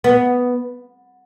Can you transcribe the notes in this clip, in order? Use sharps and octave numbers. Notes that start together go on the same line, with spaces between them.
B3